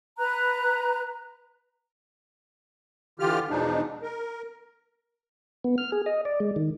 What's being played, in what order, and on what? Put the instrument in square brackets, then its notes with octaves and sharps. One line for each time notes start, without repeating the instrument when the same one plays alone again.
[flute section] B4 A#5 F#6
[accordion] D3 E3 F4 G4 F6
E2 B2 F3 G#3 D4 D#4
A#4
[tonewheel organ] B3
F6
G#4
D#5
D5
G#3
D#3